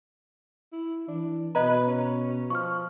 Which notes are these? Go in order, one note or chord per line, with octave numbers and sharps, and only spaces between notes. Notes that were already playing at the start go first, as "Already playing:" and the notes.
E4
E3 D4
B2 B4 D#5 A#5
C#4
F3 C#6 F6